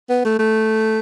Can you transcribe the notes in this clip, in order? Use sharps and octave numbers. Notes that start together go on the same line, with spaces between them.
B3
A3
A3